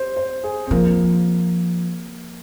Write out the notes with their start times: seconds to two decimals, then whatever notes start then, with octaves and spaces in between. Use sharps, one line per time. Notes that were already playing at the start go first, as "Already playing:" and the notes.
Already playing: C5
0.17 C5
0.44 G#4
0.67 C4
0.71 F3 A#3